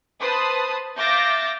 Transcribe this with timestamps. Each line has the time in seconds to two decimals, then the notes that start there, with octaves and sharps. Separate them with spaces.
0.22 B4 C5 A5 D#6
0.96 E5 F5 D6 G6 A6 A#6